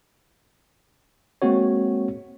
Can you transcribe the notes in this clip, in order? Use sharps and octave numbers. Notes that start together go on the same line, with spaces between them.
G#3 A#3 C4 F#4 C#5